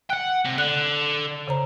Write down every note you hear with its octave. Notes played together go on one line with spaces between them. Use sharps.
F#5 G5 F#6
C3
D3 F#6
C#3 C5 A#5